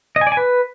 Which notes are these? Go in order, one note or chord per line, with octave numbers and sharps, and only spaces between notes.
D#5
G#5
D5
G#5
B4